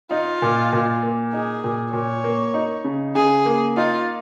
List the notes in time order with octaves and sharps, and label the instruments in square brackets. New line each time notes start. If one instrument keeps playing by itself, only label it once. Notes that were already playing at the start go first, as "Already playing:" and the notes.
[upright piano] D#4 [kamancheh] F4
[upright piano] A#2
A#2
A#3
[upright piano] D#4 [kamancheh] G#4
[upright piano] A#2
[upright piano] A#2 [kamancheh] C#5
[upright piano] A#3
D#4
C#3
[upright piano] C#3 [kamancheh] G#4
[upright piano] A#3
[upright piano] D#4 [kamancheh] F4